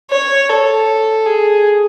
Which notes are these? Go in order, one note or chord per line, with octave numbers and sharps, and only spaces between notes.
C#5
A4
G#4